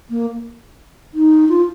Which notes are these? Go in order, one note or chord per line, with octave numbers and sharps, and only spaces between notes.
A#3
D#4
F4